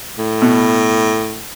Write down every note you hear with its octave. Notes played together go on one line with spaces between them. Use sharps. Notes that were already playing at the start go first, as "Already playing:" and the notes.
A2
B2